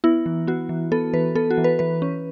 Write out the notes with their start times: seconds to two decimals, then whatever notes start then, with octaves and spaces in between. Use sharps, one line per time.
0.04 B3 E4
0.26 E3
0.47 B3 F#4
0.69 E3
0.92 B3 A4
1.13 E3 B4
1.35 B3 A4
1.51 F#4
1.58 E3
1.64 B4
1.79 E3 B4
2.02 C#4